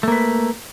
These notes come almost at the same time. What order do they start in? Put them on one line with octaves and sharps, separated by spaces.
A3 A#3 B4